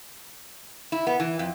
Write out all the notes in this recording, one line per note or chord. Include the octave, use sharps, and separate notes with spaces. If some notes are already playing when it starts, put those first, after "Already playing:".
E4
B3
E3
F2